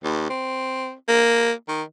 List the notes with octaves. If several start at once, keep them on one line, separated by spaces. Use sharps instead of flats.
D#2
C4
A#3
D#3